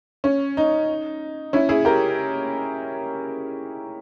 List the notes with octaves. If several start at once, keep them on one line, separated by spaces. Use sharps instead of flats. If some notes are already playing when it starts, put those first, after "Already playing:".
C#4
D#4
C#4 E4
E4 G#4
G4 A#4